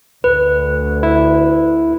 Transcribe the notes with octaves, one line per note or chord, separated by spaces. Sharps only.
D2 B4
E4